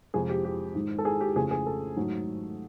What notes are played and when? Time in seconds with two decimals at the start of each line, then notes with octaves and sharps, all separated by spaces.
0.14 F2 C3 F3 G#3 G#4
0.29 G4
0.44 G4
0.75 G#2 D#3 G#3
0.98 A4
1.05 G#4
1.21 G4
1.36 F2 C#3 E3 A3 G#4
1.51 G#4
1.66 A4
1.96 G#2 D#3 F#3 A3